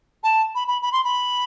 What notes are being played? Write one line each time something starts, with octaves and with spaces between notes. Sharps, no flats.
A5
B5
B5
B5
C6
B5